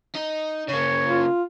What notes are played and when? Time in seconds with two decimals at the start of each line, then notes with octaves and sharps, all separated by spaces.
0.15 D#4
0.68 C#3 A#3 C#5
1.05 F4